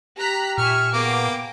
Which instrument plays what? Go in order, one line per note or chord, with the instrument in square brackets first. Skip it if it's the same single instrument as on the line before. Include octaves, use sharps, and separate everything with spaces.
[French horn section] G4 [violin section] A#5 F#6 B6
[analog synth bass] A#2 [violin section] E5 G#5 C#6 [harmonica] F6
[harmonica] A#3 D6 [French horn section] B3 [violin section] G#4 G5